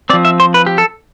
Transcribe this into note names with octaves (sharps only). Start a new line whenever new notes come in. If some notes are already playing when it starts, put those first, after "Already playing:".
F3 C4 D5
E5
C5
B4
G4
A4